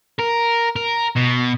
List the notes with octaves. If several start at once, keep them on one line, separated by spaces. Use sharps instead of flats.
A#4
A#4
B2